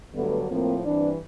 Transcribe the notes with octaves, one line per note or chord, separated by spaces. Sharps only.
G2 D3 F#3 A3 B3
A2 F3 A#3 C4
G2 E3 C4 D4